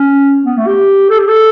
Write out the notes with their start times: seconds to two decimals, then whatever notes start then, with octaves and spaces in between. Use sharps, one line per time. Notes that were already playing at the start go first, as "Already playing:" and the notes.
Already playing: C#4
0.45 B3
0.57 A3
0.67 G4
1.10 A4
1.19 G4
1.28 A4